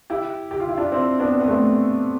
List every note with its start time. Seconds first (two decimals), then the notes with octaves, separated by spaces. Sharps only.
0.10 E4 G4
0.51 G4
0.60 F4
0.69 E4
0.77 D4 F4
0.92 C4 E4
1.20 B3 D4
1.40 B3
1.47 A3 C4